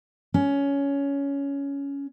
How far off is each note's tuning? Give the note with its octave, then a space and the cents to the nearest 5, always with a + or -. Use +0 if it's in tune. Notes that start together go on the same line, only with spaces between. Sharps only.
C#4 +15